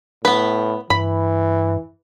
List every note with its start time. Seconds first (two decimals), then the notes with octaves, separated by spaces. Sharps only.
0.25 A2 B3 B4
0.90 G2 E3 B5